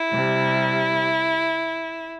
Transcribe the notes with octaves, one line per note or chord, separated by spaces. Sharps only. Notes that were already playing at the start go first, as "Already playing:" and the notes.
Already playing: E4
C3 G3